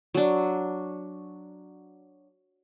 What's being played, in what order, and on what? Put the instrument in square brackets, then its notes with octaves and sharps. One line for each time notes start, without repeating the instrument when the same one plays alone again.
[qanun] F#3 D4